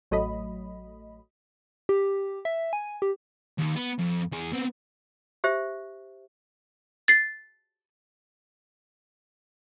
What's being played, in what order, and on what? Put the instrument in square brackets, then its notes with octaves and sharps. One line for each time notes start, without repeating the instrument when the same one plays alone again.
[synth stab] A1 F#3 A3 D#5 B5
[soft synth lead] G4
E5
G#5
G4
[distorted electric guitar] D#2 D#3
B3
F2
E2 G#4
B3 C4
[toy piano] G4 C5 E5
[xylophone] A6 C7